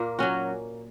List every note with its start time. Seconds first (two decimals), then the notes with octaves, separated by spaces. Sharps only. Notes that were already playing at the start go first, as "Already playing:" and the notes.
Already playing: A#2 A#3
0.19 F#3 C#4 F#4